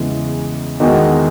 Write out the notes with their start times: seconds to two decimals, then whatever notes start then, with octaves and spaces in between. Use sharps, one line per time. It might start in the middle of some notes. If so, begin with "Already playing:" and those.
Already playing: E2 C#3 E3 G#3
0.80 E2 D#3 G#3 D#4 F#4